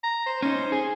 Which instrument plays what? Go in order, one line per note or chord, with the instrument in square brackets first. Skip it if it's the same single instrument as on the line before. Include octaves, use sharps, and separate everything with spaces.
[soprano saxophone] A#5
C5
[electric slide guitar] C#4 D#4 [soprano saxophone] C5
[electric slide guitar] G#4 [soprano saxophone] G#5